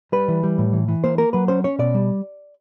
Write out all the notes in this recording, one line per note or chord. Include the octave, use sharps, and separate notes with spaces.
G3 B4
E3
G3
A2
E3
E3
A#3 C5
A#3 A#4
F#3 B4
C#4 C5
C#4 C#5
B2 D5
G3